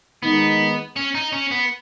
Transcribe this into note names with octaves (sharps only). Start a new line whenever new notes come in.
D#3 G#3 B3 D#4
C#4
D#4
C#4
B3